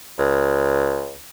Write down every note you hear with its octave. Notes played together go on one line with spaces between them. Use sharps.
C#2